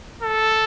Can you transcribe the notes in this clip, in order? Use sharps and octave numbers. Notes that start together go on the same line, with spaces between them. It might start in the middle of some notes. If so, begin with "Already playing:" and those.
A4